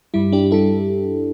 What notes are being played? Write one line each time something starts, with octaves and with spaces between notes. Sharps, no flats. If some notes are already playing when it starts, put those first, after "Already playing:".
G2 G3 E4
D4 G4
G3 E4 A4